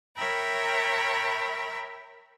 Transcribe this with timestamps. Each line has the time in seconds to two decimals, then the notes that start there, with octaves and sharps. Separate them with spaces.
0.15 A#4 C#5 E5 G5 A#5 B5